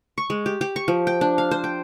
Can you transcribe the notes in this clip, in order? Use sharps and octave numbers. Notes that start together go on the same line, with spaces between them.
C#6
G#3
G4
G4
C#6
F3
G5
D4
F5
C5
G5